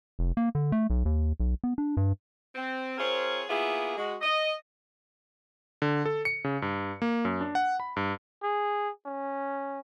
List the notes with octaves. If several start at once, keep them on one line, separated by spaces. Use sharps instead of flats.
F1
A#3
D3
A3
B1
D#2
B1
B3
D4
G2
C4
C4 F4 G#4 A#4 C5 C#5
A#3 B3 E4 F4 G#4
G#3 F#4
D#5
D3
A4
C#7
C#3
G2
A#3
F#2
D4
F#5
B5
G2
G#4
C#4